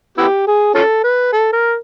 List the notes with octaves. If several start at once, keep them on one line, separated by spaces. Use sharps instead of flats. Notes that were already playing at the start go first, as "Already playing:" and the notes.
B3 E4 G4
G#4
C#4 F4 A4
B4
A4
A#4